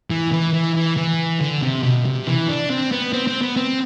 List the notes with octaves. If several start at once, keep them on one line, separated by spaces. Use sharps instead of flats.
E3
E3
E3
E3
E3
D3
C3
B2
C3
E3
D4
C4
B3
C4
C4
B3
C4